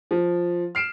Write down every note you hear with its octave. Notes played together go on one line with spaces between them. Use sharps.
F3
F6 C7 D7 E7